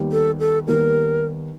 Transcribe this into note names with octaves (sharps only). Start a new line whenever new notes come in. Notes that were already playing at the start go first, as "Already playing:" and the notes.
Already playing: D#2 D#3 G3 B3
A4
A4
D#2 D#3 G3 B3 A#4